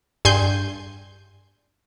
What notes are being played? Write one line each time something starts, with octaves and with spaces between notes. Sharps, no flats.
G2 G#5 C6 G6